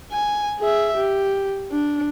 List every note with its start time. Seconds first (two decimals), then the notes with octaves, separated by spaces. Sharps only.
0.12 G#5
0.60 G#4 E5
0.97 G4
1.71 D4